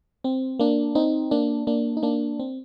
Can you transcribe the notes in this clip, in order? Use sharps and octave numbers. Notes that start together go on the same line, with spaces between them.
C4
A#3 D4
C4 D#4
A#3 D4
A#3 D4
D#4
A#3 D4
C4